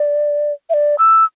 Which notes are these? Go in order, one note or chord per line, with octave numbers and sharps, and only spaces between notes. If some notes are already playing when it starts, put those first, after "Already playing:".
Already playing: D5
E5
D5
E6